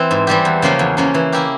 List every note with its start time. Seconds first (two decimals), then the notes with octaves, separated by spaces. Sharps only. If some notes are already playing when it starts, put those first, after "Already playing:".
Already playing: E3 C4
0.11 G#2
0.27 E3 G3 C4 G4
0.45 E2
0.62 C#3 F3 A#3 C#4
0.79 E2
0.97 C#3 F3 A#3 C#4
1.14 E3
1.32 A#3 E4 G4 A#4